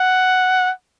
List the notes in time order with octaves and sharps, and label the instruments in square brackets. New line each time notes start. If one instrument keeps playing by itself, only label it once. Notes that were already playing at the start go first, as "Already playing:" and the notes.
Already playing: [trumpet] F#5